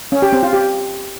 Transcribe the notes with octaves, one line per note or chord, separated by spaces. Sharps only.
C#4
G4
C4
F4
G4